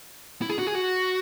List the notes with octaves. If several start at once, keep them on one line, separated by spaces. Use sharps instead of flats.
E4
G#4
F#4
G#4
F#4